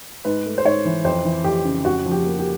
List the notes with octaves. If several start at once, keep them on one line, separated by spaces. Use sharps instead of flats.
G#2 B4
A3
C5
G#2 C#5
E3
F2 C5
E3
F2 G4
C#3
F2 F#4
F3
G4
A#3
G4